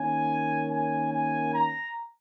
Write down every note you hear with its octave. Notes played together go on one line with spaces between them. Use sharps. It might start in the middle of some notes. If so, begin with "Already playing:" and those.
Already playing: D#3 A#3 C#4 G#5
G#5
G#5
A#5